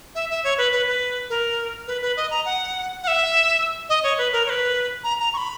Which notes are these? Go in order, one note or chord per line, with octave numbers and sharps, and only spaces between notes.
E5
E5
C#5
B4
B4
B4
A#4
B4
B4
D#5
A#5
F#5
F#5
E5
D#5
C#5
B4
A#4
C#5
B4
A#5
A#5
C#6
B5